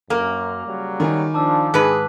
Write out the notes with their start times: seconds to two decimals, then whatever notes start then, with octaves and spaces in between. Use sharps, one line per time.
0.10 F#2 A#3 A#4 D6
0.66 C#3 F#3 G3
1.00 D#3 D#4 G#5 B5
1.34 F3 D4 A5 D6 E6
1.74 G#2 G#4 B4 F#6 B6